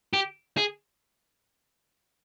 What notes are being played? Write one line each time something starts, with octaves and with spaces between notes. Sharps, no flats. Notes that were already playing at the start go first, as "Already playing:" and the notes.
G4
G#4